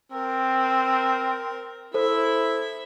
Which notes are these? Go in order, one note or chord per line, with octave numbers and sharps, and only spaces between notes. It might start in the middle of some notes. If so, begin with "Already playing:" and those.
C4 A#4
E4 A4 C5 E5